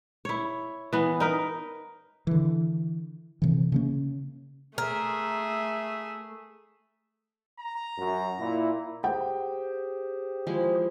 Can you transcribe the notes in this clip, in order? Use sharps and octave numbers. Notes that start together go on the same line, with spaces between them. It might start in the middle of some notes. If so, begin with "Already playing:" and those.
E4 C#5
E3 B3
D#4 A#4 B4
D3 E3
C3 E3
C#3 A#3 C#4
A3 G#4 A#4 E5
A#5
F#2
A#2 E4
G4 G#4 C5 G5
F3 G#3 E4